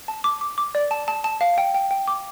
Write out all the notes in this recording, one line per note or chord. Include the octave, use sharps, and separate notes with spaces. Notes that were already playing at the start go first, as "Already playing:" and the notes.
A5
D6
D6
D6
D5
A5
A5
A5
F5
G5
G5
G5
D6